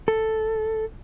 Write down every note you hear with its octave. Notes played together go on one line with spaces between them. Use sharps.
A4